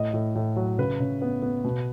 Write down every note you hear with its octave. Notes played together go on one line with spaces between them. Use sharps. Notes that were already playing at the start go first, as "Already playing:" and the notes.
Already playing: A2 D#5
A2
A2
F#3
C#3 B4
C#3
B3
B3
B2